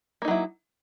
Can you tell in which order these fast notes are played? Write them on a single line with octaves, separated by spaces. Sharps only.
A#3 D#4 F#3 E4